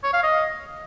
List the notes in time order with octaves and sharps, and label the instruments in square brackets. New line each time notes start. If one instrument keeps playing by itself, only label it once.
[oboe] C#5
F5
D#5